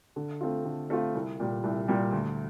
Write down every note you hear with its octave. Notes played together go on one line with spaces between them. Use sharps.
D3
A3 C4 F4
D3
A3 C4 F4
C2
A#2 G3
C2
A#2 G3
D2